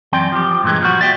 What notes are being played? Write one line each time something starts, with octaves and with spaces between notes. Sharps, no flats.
F#2 E3 C4 D5 G5
F3 G4
G2 A#2 D#3 E3 G#3
A#2 F3 G3 F#4
D5 E5 G5